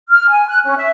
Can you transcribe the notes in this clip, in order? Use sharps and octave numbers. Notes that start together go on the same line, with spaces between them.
F6
G#5
F#6
C#4
E5